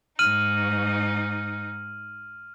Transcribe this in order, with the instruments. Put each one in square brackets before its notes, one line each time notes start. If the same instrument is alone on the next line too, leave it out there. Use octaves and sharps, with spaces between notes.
[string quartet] G#2 D#4 [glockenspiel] F6 D#7 F#7